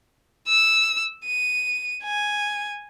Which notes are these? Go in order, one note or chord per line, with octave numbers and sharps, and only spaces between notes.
E6
D#7
G#5